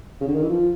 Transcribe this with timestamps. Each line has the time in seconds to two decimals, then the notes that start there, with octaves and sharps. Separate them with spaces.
0.21 C#3
0.28 D3
0.35 D#3
0.43 E3
0.50 F3